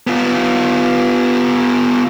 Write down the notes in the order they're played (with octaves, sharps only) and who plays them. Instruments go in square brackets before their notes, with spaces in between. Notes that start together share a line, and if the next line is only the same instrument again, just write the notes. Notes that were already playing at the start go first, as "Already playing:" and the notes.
[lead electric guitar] B3 F4